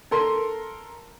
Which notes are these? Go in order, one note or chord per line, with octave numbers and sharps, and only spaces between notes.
A4 A#4 C6